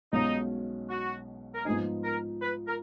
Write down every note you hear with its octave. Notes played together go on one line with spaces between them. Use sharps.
B1 B2 G#3 C#4 D#4 F4
F#4
A#4
G#2 F3 B3 D#4 G#4
A#4
B4
A#4